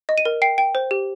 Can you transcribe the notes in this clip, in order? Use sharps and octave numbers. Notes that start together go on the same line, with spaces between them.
D#5
D#7
A#4
G5 C7
G5
C5
G4